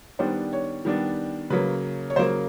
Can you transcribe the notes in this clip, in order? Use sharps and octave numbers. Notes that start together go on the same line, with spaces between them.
D#3 G3 B3 D4 C5
C#5
D#3 G3 B3 D4
C#3 F#3 A#3 B4
C#5
C#3 F#3 A#3 C5